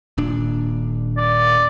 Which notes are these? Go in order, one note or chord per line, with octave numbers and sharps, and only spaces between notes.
D#1 A#2 D4
D5